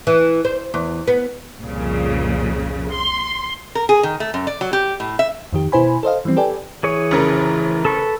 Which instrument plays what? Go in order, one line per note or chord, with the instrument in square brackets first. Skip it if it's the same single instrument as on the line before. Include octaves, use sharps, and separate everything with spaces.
[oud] E3
C5
E2
B3
[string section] C2 F2 A#2 C#3
C6
[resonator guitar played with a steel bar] A#4
G#4
D#3
A3
F#2
D5
F#3
G4
A2
E5
[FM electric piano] F2 D#3 G4
B2 E4 B4 C5 G#5 B5
A4 C5 D#5 F5
E3 F3 G3 C4
G4 A4 B4 D5 G5 G#5
[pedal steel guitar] E3 G#4 C#5
[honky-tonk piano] F1 C#3 A#4
[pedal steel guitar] A4 B4 C#6